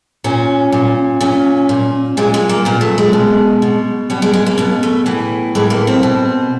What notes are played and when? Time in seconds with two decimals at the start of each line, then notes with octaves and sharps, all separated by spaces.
0.24 A#2 C#4
0.72 A#2
1.20 A#2 C#4
1.69 A#2
2.17 A#2 G#3
2.34 G#3
2.49 A#3
2.65 A#2 B3
2.81 A3
2.98 G#3
3.13 B2
3.62 B2
4.10 B2 G3
4.22 G#3
4.33 G#3
4.46 A#3
4.58 B2 G#3
4.83 A3
5.06 A2 E3
5.55 A2 E3 G#3
5.70 A#3
5.87 C4
6.03 B2